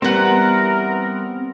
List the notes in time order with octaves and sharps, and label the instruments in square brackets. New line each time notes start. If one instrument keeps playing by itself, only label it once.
[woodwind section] E3 A#4 [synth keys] G3 B3 [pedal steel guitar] C4 F#5